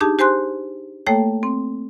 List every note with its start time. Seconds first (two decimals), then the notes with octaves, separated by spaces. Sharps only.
0.01 D4 D#4 G4 G#4 A5
0.19 G4 C5 G#5 C6 F#6
1.07 A3 A#3 A4 C#5 G5
1.43 C4